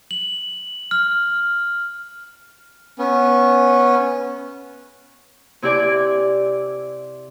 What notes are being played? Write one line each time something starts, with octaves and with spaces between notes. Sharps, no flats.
F#7
F6
B3 C#4
C3 E4 G4 D5 G#5 D6